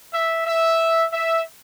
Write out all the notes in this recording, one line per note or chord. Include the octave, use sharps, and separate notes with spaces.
E5
E5
E5